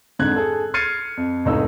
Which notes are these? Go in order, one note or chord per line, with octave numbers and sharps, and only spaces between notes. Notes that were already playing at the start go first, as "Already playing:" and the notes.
F2 G#2 D3 F#6 G#6
G#4 A4
F6 G#6 A6 C7 C#7 D#7
F2
F1 C#2 A2 D#4 E6